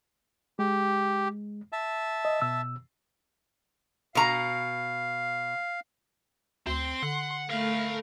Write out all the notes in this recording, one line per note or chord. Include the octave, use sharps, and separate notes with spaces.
G#3 G4
E5 A5
D#5
B2 E6
B2 F5 A#5
D2 C4 C6
D3 F#5
A3 A#4 F5 B5